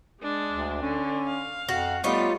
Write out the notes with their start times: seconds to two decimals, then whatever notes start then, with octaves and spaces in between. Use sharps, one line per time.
0.21 G#3 D4
0.51 D2
0.82 D3 C#4
1.26 F5
1.69 F2 F#4
2.04 G3 A3 B3 D#4 F4 C#5